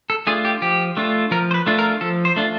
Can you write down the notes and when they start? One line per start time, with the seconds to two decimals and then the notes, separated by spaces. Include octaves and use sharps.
0.10 A4
0.27 A3 D4 F4 G#4
0.45 G4
0.62 F3 G4
0.97 A3 D4 F4
1.31 F3 A#4
1.51 C5
1.54 B4
1.66 A3 D4 F4
1.79 A#4
2.01 F3 A4
2.25 C5
2.36 A3 D4 F4